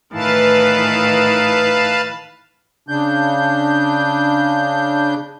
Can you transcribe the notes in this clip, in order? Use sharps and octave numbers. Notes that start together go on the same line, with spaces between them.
A2 D#3 E3 B4 F5 A5
C#3 D4 G6